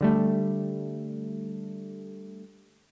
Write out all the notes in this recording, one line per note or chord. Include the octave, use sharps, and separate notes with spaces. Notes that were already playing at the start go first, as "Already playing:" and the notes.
D3 G3 A3